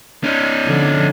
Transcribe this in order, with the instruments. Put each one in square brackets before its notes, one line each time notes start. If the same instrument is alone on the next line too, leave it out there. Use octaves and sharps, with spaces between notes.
[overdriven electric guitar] C#4 D#4
[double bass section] D3 F3